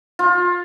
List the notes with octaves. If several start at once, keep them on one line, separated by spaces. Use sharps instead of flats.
F4